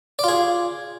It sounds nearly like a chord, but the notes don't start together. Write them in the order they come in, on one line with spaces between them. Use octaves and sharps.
D5 F4 G#4